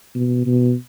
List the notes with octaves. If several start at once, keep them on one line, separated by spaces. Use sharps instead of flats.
B2
B2